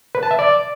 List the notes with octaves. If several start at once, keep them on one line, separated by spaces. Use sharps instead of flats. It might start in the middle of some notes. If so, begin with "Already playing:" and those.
B4
A5
E5
D5